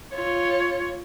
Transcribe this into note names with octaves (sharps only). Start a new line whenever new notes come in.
F4 C#5